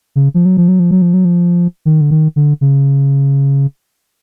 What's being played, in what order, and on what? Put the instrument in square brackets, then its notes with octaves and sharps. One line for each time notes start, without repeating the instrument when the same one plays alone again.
[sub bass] C#3
F3
F#3
F3
F#3
F3
F#3
F3
F#3
F3
D#3
D3
D#3
D3
C#3